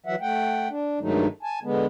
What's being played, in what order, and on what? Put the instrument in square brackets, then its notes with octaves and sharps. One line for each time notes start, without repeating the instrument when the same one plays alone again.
[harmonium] E3 F#3 E5 F#5
A3 F#5 G5
D4
G2 D#3 F#3 G#3 A3 D#4
G#5 A5
D3 G#3 B3